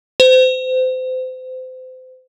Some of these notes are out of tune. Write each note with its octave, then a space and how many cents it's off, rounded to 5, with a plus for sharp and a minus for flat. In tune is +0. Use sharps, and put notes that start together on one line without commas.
C5 -30